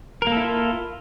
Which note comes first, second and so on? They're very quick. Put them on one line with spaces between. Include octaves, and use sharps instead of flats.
A#4 A#3 A4 E4 F4